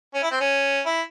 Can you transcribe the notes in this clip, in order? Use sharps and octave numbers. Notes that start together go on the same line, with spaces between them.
C#4
E4
C4
C#4
E4